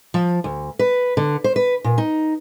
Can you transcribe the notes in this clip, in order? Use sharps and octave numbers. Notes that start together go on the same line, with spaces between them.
F3
D2
B4
D3
C5
B4
A#2
D#4